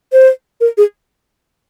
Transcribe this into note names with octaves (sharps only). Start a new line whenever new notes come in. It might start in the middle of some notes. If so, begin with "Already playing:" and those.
C5
A#4
G#4